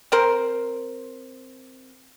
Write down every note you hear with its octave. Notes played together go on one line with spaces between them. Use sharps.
C4 A#4 C5